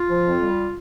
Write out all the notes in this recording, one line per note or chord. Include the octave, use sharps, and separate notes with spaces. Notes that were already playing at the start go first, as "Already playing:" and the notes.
Already playing: F4
F3
F2
G3